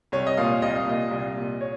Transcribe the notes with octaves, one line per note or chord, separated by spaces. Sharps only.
C2 C#5
D#5
A#2 F5
C2 D#5
F5
A#2 D#5
C2
A#2
C#5